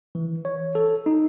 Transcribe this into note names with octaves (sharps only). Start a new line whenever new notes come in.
E3
C#5
A4
D#4